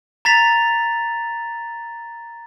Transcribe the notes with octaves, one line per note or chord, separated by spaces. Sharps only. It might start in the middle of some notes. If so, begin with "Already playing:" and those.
A#5 A6 B6 F7